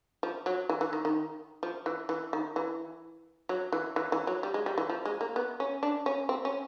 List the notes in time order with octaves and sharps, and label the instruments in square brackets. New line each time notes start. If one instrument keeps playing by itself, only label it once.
[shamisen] F3
F#3
E3
E3
D#3
D#3
F3
E3
E3
D#3
E3
F#3
E3
E3
E3
F#3
G3
G#3
G3
E3
F3
G#3
A#3
B3
C#4
D4
C#4
C4
C#4